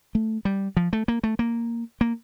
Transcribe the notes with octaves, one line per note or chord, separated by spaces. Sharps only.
A3
G3
F3
A3
A#3
A3
A#3
A#3